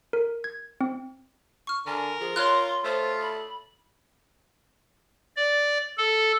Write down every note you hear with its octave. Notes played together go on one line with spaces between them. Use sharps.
A#4
G#6
C4
C#6 F6
D3 A#4 G#5
F3 G#4
F4 C#5 C6 F6 F#6
A3 F4 C5
B5
D5
A4